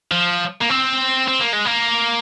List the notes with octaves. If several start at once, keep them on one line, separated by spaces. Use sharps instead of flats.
F3
A#3
C4
C4
A#3
G#3
A#3